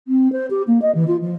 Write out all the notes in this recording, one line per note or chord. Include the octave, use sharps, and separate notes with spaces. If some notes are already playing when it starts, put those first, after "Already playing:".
C4
C5
G4
A#3
D#5
E3
F4
F3